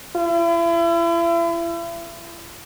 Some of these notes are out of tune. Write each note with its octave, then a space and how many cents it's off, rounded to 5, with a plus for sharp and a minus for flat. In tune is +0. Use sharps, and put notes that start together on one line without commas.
E4 +40